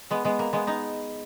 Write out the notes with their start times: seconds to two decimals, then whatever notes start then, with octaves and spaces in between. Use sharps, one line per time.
0.11 G#3 B3
0.25 G#3 B3
0.39 A#3
0.53 G#3 B3
0.67 B3 D#4